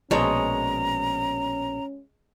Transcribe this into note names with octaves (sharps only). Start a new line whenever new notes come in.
A#1 B2 G#3 C#4 C#5 A5 A#5